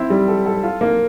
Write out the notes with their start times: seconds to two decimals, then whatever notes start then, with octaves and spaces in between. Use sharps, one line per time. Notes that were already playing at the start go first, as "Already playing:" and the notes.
Already playing: C4 E4
0.10 G3
0.28 A4
0.46 A4
0.63 F4
0.81 A#3